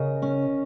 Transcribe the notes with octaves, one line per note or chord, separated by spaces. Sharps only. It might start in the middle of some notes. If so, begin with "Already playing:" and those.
Already playing: C#3 A#4 D#5
C#4